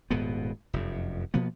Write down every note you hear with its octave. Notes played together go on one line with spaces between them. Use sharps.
D#1 G#2 B2 B3
F1 F#2
B2 F3 A#3 B3